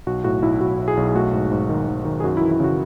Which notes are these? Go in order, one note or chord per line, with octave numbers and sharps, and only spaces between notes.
B1 F#4
A2 F#4
B1 E4
B1 F#4
B1
G#4
B1
G#4
A3 F#4
G#2
G#2
D#3
D#3
D#3
G#4
F#2 F#4
E4
E3
E4
C#3 F#4